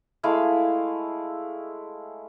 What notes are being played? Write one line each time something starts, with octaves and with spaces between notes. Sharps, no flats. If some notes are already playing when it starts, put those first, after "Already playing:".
G#3 A3 E4 F5